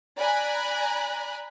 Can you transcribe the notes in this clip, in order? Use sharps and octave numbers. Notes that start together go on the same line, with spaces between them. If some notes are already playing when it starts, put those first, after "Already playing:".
D5 G#5 A#5 B5 F#6